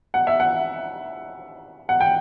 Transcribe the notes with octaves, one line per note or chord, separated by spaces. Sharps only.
F#5
E5
F#5
F#5
G5